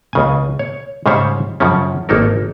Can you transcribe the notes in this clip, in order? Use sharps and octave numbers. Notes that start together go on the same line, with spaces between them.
C#2 C#3 G#5
C#5
G#2 C#3 G3 C5 C#5 E5
F#2 C#3 F3 C#4
G#1 A#3 D#4 A4 A#4